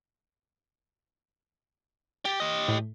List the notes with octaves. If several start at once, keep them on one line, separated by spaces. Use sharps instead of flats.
G4 A6
G4 D#5
A2